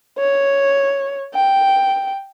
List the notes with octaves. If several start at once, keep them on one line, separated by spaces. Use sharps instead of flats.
C#5
G5